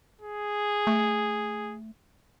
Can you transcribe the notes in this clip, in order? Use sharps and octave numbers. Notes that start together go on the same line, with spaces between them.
G#4
A3